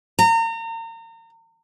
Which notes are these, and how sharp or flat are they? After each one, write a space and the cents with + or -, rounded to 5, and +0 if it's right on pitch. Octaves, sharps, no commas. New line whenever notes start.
A#5 -35